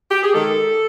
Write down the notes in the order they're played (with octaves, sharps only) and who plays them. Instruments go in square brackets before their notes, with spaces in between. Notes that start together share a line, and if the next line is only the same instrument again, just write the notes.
[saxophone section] G4
G#4
D#3 G#3 A4